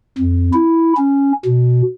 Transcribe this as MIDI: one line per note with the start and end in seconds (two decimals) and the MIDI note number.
0.19 0.50 41
0.53 0.93 64
0.97 1.32 61
1.45 1.82 47